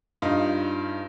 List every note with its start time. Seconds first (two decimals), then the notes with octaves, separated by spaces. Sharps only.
0.22 G2 D#4 F4